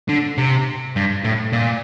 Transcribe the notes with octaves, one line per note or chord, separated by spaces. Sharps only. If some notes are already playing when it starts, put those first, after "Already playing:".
D3
C3
G2
A2
A#2